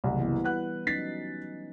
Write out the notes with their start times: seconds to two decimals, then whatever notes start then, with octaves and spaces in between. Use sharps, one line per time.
0.04 F#1 C2
0.18 E3 G3 B3
0.44 B4 F#5 F#6
0.87 F#3 C#4 D#4 A6 B6 C7